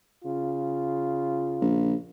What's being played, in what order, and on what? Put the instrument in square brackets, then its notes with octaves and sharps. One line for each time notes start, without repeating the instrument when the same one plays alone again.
[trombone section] C#3 F4
[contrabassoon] A#1